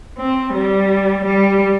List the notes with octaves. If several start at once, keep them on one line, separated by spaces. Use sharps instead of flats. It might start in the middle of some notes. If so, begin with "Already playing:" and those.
C4
G3
G3